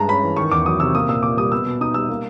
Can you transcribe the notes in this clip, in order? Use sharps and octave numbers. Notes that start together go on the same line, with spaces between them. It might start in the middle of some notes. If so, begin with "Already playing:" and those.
Already playing: G2 G#3 A5 A#5
C#4 B5
E3
D#3 C#6
E2 D6
F#3 D#6
C3 E6
A#3 D#6
A#2 E6
A#2 D6
G3 D#6
B3 E6
B2
D#4 D#6
G3 E6
A#3